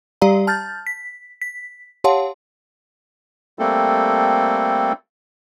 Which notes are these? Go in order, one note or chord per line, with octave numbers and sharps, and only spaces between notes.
G3 G4 D5 F5 A#5
A5 F6 G6 A6
B6
B6
G4 C#5 F5 F#5 A5 C6
G3 A3 A#3 C4 A4